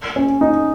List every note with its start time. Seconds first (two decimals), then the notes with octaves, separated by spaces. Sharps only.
0.16 C#4
0.41 D#4